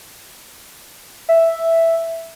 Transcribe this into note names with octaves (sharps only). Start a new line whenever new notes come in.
E5